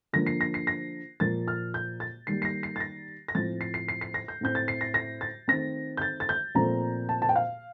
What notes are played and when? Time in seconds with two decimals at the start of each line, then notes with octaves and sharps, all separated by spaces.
0.13 D3 F3 A#3 A#6
0.26 C7
0.41 A#6
0.54 C7
0.67 A#6
1.20 A#2 F3 A#3 A6
1.48 F6
1.74 G6
2.00 A6
2.27 D#3 G3 A#3 C7
2.42 C7
2.45 A#6
2.63 C7
2.76 A6
2.80 A#6
3.28 A#6
3.35 A2 F3 C4 A6
3.61 C7
3.74 C7
3.88 C7
4.01 C7
4.14 A#6
4.28 G6
4.41 A2 A3 C4 G6
4.55 A6
4.68 C7
4.81 A#6
4.94 A#6
5.21 A6
5.48 D#3 A3 C4 A#6
5.97 G6
6.02 A6
6.20 A6
6.29 G6
6.55 A#2 F3 A3 C4 A#5
7.09 A5
7.22 A5
7.29 G5
7.36 F5